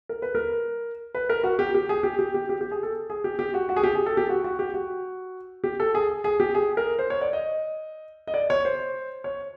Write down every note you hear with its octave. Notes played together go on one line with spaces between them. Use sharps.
A#4
B4
A#4
B4
A#4
F#4
G4
G4
G#4
G4
G4
G4
G4
G4
G#4
A4
G#4
G4
G4
F#4
F#4
G#4
G4
G#4
A4
G4
F#4
F#4
G4
F#4
G4
A4
G#4
G#4
G4
G#4
A#4
C5
C#5
D5
D#5
D#5
D5
C#5
C5
C#5